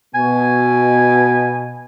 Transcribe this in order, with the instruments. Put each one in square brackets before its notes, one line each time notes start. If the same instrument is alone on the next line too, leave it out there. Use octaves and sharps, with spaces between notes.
[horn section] B2 [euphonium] B3 [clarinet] G#5